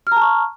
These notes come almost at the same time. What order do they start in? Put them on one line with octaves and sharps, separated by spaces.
F6 A#5 A5 C#6